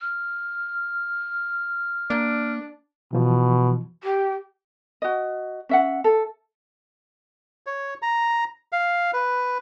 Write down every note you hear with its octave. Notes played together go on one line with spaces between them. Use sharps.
F6
A#3 D4
B2 E3 F3
G4
F#4 D#5
C#4 E5 F#5
A4
C#5
A#5
F5
B4